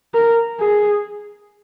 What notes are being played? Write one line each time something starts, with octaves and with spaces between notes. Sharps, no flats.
A#4
G#4